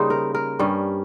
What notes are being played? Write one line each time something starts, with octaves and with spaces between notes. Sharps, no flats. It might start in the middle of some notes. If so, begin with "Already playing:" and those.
Already playing: C#3 G3 A#3 D#4 C5
A#4
A#4
G2 G3 C#4